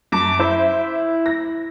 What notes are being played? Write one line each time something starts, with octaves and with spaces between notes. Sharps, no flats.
F#2 A5 D6
E4 C5 E5
A#6